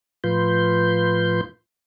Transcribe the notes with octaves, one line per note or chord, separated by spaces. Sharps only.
A2 F3 F4 B4 C6 G6